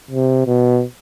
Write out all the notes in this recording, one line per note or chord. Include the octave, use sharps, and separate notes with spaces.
C3
B2